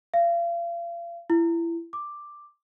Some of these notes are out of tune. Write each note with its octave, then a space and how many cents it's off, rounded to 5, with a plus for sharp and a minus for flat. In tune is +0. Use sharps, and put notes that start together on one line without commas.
F5 -35
E4 +25
D6 +5